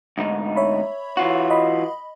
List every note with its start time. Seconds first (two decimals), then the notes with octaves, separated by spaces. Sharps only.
0.18 D2 G#2 D#4
0.56 C#5 E5 B5
1.17 E3 F4 F#4
1.50 D#5 B5